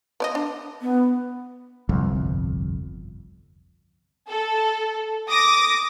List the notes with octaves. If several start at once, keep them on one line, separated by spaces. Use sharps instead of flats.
B3 D5 D#5
D4
B3
G1 C2 F2
A4
D6 D#6 A#6